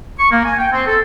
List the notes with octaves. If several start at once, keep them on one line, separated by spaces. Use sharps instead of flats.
C#6
A#3
G#5
G5
C4
A4